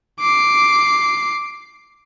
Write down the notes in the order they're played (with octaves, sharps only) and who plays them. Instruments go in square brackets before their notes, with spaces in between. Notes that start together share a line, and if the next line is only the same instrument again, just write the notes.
[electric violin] D6 C7